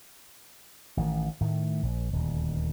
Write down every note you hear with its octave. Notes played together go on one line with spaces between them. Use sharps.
A1 D#3
A2 D#3 A3
A#1
D#1 D2